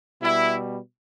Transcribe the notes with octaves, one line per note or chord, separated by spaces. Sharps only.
B2 G3 E4